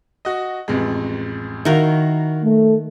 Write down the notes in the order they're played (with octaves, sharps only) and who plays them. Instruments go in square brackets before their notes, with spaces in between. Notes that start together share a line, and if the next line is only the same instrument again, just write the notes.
[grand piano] F#4 D#5
A1 F2 G#3
[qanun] D#3 A#4 [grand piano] E4 F#4 F5
[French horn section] A3